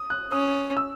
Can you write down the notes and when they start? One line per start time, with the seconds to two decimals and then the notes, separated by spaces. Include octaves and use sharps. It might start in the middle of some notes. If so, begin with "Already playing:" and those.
Already playing: D#6
0.10 F#6
0.32 C#4 D#6
0.77 E6